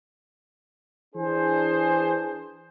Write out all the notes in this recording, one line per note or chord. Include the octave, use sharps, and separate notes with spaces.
E3 D4 G#4 C5